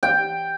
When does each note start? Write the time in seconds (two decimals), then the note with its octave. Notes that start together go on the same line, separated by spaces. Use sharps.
0.03 G5